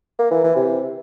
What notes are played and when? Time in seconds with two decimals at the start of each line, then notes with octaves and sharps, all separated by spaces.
0.19 A#3
0.31 E3
0.44 E3
0.56 C3